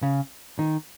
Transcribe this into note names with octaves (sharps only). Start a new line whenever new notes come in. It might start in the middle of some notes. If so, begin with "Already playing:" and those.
C#3
D#3